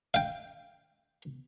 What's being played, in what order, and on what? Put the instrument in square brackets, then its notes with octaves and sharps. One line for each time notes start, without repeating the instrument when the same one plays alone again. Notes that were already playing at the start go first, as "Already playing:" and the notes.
[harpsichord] F5 G5